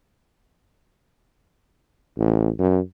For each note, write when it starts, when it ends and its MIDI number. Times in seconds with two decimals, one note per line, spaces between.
2.18 2.50 33
2.59 2.80 42